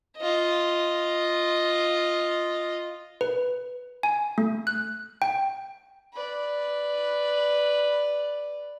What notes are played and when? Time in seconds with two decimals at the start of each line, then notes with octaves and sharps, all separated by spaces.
0.18 F4 D#5
3.21 B4
4.03 G#5
4.38 A3
4.67 F#6
5.22 G5
6.13 B4 D5